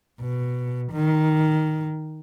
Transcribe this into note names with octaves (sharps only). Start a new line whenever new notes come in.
B2
D#3